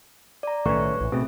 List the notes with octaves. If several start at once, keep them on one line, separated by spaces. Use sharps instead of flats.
D5 A#5
B1 A2 D#3 A3 C#4 B4 C#5 C#6
A#1 A2 E3
B2 A3 C4 G#4